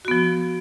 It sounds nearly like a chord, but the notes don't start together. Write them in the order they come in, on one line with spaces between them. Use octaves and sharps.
F#4 B3 F3